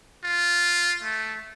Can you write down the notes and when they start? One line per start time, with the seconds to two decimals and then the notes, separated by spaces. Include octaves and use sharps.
0.24 F4
1.03 A3